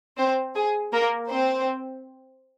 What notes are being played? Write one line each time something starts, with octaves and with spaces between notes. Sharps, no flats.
C4 C5
G#4
A#3 A#4
C4 C5